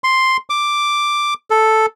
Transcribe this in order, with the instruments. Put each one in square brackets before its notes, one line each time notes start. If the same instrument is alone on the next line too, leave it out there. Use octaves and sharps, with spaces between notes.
[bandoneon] C6
D6
A4